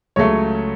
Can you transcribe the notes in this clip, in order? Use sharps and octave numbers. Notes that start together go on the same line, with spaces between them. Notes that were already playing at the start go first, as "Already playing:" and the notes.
C#2 C#3 F#3 A3 C#5